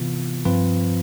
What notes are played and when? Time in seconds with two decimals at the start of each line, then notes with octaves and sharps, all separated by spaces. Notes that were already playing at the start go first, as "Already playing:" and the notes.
Already playing: C3 E3 B3 F4
0.45 G2 F3 C4 F4 B4